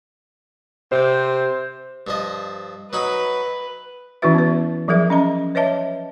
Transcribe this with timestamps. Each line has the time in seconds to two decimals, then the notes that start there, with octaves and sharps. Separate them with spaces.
0.92 C3 C5 G6
2.07 G2 F3 D#5
2.93 F#3 D#4 B4 B5
4.22 E3 C#4 E4 F#4 B4 E5
4.34 B3 B4
4.88 F3 F#3 G#4 A#4 E5
5.10 C#4 D#5 A#5
5.55 B4 C#5 D#5 E5 A5